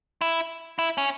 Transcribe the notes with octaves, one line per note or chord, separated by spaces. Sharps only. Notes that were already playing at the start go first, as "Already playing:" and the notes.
E4
E4
C#4